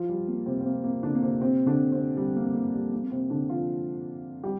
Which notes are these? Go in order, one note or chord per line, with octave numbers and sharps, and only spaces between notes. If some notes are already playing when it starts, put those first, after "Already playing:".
Already playing: F3 F4
G3
A#3
C3 C4
C4
A#3
A#3
D3 D4
A#3
C3 C4
C3 C4
D3 D4
C3 C4
G3
A#3
A#3
G3
A#3
A#3
C3 C4
D3 D4
F3 F4
G3 G4